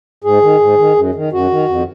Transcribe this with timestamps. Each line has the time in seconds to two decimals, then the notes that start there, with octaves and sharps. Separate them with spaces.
0.24 G#2 G#4
0.42 D#3
0.60 G#2
0.78 D#3
0.96 F#2
1.15 D#3
1.33 F#2 F#4
1.51 D#3
1.69 F2